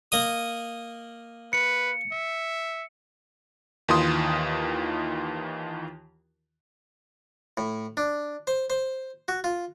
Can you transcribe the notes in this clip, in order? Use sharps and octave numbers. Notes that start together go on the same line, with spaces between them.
A#3 D#5 D#6
B4 C#7
E5
D#2 D#3 E3 F4 C6 D#6
A2
D4
C5
C5
F#4
F4